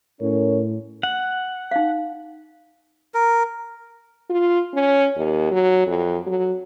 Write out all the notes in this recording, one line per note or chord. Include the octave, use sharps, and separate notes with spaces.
A2 C#4 A#4 C#5
F#5
D#4 F5
A#4
F4
C#4
D#2
F#3
F2
F#3